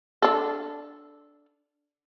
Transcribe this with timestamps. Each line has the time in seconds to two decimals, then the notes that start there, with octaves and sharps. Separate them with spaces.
0.22 D4 A4